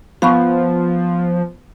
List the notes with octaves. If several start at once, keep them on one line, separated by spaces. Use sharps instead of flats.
F3 B3 F5 B5 C#6